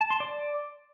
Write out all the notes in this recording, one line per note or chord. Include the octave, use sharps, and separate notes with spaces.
A5
C6
D5